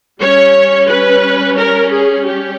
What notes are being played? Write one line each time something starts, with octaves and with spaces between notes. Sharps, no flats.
G3 C#4 C#5
B4
A#4
G#4
G4